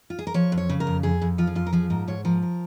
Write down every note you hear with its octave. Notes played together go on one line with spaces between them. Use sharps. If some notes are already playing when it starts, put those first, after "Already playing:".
F4
G#4
A#4
F3 C#5
F2
C#5
C#3
A#4
F2
F2 G#4
F2
F3 F4
G#4
F2 F4
A#4
F3 G#4
G#2 A#4
G#2 C#5
F3 A#4
A#4